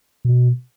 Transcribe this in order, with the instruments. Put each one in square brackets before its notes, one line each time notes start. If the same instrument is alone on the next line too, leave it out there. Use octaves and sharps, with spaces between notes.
[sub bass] B2